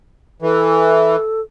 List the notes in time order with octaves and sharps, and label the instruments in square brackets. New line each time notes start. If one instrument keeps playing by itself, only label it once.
[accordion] E3 [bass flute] A4